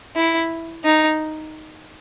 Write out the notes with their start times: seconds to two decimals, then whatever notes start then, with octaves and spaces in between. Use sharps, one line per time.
0.16 E4
0.85 D#4